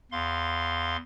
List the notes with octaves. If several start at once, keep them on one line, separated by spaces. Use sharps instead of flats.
E2 F5 C6